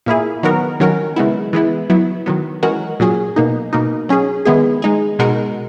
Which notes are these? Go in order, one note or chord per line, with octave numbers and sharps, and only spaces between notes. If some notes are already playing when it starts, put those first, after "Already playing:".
A#2 A#3 E4 G#4
D#3 F#3 B3 F#4 A#4
D#3 F#3 C#4 F#4 A#4
C#3 G#3 B3 E4
E3 G#3 B3 E4
F#3 B3 E4
D#3 F#3 B3
E3 G#3 C#4 F#4 A#4
A#2 F#3 C#4 G#4
B2 A#3 D#4
B2 A#3 D#4
F#3 C#4 G#4
D#3 G#3 B3 E4 G#4
G#3 D#4 G#4
B2 G#3 D#4 F#4 A#4